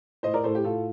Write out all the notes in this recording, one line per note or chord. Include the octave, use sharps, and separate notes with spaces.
A2 C5 D#5
A#4 D5
A2 A4 C5
G4
A2 F4 A4